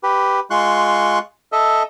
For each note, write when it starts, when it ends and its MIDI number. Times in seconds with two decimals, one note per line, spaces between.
0.03 0.40 67
0.03 0.40 71
0.51 1.19 56
0.51 1.19 65
0.51 1.19 84
0.51 1.19 85
0.51 1.19 90
1.52 1.83 69
1.52 1.83 75
1.52 1.83 76